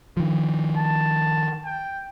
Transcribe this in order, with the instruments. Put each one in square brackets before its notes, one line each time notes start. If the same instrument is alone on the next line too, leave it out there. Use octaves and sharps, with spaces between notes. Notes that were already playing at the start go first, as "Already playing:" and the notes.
[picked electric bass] D#3 F3
[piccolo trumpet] A5
G5